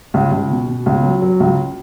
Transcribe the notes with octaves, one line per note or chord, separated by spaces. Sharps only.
C#2
C#2
B2
B2
C#2
F#3
F#3
C#2